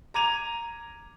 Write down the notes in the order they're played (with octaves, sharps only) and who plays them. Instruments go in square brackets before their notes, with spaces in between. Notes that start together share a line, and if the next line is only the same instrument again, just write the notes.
[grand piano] A#5 D6 G#6 D#7 F7